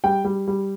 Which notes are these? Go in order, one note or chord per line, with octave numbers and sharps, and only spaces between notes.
G3 G5
G3
G3